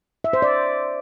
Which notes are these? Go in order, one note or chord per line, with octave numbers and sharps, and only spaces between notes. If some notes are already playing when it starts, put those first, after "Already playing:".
E5
C5
D5